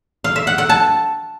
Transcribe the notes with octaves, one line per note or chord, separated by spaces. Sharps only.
F5
E5
F#5
F#5
A5